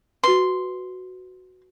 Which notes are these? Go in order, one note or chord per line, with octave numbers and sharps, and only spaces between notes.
F#4 B4 C6